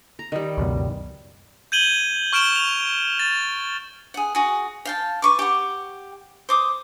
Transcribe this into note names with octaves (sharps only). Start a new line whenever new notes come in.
A#5
D#3 G3
C#2 F#2 B2
G6 G#6 D#7 F#7 G7
C#6 F6 D7 E7 G7
C#6 F7
A6
G#4 F#5
F#4 G#4
F5 G5 A5
B4 C#6 D6
G4 F#5
C5 D6 D#6